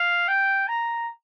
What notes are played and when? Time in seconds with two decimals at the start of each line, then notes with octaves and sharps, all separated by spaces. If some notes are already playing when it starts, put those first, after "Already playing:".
Already playing: F5
0.28 G5
0.68 A#5